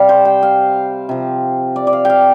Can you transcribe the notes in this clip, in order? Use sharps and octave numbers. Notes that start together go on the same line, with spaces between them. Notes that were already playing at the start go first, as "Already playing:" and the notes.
Already playing: C3 G3 F5
C5
G5
F5
C3 F3
D5
D5
F5
F5 G5